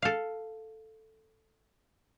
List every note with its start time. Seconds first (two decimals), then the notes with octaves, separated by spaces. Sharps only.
0.02 A4 F5